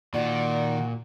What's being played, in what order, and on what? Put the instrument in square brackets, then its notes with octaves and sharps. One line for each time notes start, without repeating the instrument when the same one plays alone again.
[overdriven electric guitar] A#2 [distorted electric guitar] D#3 [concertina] F#4 [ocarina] D5